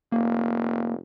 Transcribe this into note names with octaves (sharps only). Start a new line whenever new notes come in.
F1 A#3